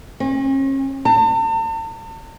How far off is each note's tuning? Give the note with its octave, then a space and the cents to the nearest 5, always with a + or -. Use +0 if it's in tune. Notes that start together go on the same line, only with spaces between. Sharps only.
C#4 -40
A5 +45